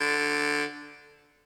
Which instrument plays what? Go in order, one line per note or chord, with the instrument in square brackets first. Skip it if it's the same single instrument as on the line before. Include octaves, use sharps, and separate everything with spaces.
[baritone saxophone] D3